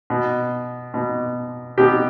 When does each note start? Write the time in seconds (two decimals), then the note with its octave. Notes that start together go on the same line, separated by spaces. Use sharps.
0.10 B2
0.94 B2
1.78 B2 G4